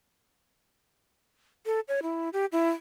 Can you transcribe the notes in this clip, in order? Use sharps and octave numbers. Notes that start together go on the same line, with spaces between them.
A4
C#5
E4
G4
E4